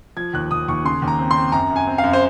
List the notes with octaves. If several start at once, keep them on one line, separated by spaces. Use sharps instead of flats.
F3 G#6
D#2 F#6
D#2 D#6
D#2 C#6
C#3 C6
D#2
A#5
C4
C6
C4
F#2 A#5
F#2
G#5
C4
F5
F#2
C5